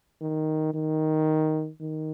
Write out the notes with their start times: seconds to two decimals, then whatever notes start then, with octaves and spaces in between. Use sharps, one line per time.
0.21 D#3
0.74 D#3
1.80 D#3